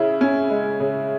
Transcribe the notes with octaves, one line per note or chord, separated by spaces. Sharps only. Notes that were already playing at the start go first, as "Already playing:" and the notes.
Already playing: C#3 E4
C#4
G#3
C#3